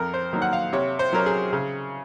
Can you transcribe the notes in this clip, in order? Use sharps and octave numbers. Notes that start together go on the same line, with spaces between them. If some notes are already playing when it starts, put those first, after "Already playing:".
Already playing: F2 A#4
C5
D#3 F#3 A#3
F#5
F5
C3 C#5
C5
F#3 C#4 A#4
G#4
C#3